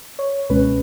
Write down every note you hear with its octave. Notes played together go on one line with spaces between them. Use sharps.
C#5
C#2 B2 G#3 C#4 B4